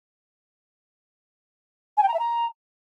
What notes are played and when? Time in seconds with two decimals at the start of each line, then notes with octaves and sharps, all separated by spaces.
1.97 G#5
2.03 G5
2.08 A#5
2.14 E5
2.19 A#5